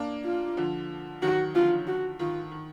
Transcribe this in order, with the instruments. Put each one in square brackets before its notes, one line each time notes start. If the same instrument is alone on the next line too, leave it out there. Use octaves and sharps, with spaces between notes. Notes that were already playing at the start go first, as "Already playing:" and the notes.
Already playing: [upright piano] A#3 D4
[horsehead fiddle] F4
[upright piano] D3 F3
[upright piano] D#3 F#3 [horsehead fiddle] F#4
[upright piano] D3 F3 [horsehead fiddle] F4
[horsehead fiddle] F#4
[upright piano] D#3 [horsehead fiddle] F4
[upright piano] D#3